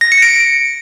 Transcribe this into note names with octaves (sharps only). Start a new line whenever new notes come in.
A#6
C#7
D7